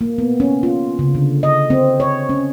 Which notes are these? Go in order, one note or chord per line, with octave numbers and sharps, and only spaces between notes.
A#3
B3
C#4
F4
C#3
D3
D#5
C4
C#5
C#4